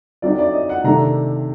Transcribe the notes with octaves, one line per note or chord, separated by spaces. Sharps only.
D3 F#3 C4 D#4 D5
D5
D#5
F#5
C3 D#3 A3 D4 A#5